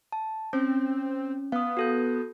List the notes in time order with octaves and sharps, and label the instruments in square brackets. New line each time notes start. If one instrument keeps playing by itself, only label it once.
[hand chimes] A5
[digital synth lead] C4 [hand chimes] C#4
[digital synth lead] B3 [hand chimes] F5 D#6
[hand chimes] F#4 A4 G6